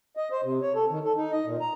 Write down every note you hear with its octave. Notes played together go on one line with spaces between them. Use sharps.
D#5
C5
C3
C#5
A4
D#3
A4
D#4
D#5
A#2
A#5